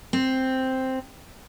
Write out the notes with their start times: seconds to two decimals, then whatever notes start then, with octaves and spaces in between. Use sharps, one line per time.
0.13 C4